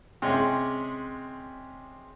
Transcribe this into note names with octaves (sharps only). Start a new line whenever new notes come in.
C3 G#3 C#4 G#4